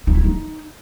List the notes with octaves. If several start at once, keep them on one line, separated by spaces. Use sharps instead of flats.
D#4
E4
D#4